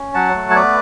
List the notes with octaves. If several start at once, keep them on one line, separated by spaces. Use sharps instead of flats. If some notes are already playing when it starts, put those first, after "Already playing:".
Already playing: C#4
F#3 F#5 A5
A3
C#5
B3 B4 D5